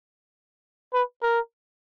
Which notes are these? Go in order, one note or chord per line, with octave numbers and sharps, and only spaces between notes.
B4
A#4